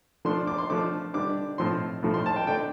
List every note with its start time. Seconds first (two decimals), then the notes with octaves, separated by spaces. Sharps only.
0.25 F3 A3 D4 C6
0.47 D6
0.58 C6
0.69 F3 A3 D4 D6
1.14 D3 G3 D4 D6
1.58 A2 F3 C4 C6
2.03 A2 F3 A3
2.14 C6
2.26 A5
2.36 G5
2.47 D3 A3 D4 G5